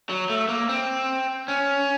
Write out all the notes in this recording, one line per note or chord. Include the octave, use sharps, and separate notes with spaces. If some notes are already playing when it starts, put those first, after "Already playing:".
F#3
A3
A#3
C4
C#4